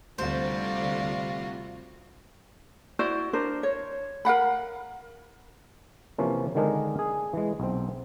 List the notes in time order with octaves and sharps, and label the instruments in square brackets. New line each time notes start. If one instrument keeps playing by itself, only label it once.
[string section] D2 A3 D5 [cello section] C3 G3 [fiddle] F4 F#4 [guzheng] C5
[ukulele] E4 F#4 C5 D5
D4 A#4 C5
C#5
A#4 F5 F#5 B5
[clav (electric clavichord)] C3 E3 F3 A#3 C#4
D3 D#3 G#3 D4 G#4 A#4
G#4
E3 G#3
B1 C4